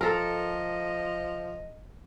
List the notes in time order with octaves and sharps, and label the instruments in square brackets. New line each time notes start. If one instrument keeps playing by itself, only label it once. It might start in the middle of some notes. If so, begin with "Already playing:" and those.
[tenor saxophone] F3 [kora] A4 A#4 [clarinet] D#5